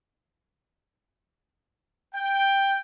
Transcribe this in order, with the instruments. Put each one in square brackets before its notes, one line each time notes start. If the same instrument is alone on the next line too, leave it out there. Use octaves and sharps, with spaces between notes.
[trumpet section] G5